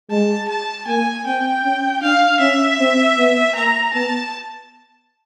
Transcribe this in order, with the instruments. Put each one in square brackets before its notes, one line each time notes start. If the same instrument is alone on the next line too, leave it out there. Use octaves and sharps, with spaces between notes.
[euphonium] G#3 [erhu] A5
[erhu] A5
[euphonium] A#3 [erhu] G#5
[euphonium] C4 [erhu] G5
[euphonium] C#4
[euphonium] D4 [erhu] F5
[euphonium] C#4 [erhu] E5
[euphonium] C4
B3
[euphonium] A#3 [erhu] A#5
[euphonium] B3 [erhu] A5